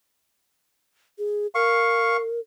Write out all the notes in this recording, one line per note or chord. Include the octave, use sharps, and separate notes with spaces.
G#4
A#4 F5 C#6